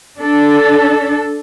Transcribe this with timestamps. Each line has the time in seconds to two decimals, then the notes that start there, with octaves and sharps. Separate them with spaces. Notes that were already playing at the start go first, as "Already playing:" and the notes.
0.18 D4 A4